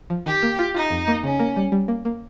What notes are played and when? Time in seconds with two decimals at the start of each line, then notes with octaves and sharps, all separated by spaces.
0.10 F3
0.26 D#3 G4
0.42 A#3
0.59 F4
0.74 D#4 F4
0.90 F2
1.08 A#3
1.23 C#3 C#4
1.39 A#3
1.56 G3
1.72 G3
1.88 A#3
2.05 A#3